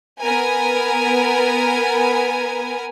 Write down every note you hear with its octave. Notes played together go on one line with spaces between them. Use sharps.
B3 A#4 G#5